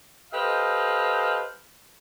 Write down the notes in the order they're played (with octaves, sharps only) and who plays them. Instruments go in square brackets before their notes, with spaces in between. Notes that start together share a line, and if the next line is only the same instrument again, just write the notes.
[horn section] G4 A4 B4 C5 D#5 F5